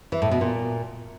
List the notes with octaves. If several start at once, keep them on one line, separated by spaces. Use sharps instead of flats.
E3
A2
B2
A#2